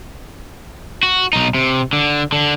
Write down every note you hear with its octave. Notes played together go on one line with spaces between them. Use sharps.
F#4
B1 D#4
C3
D3
D3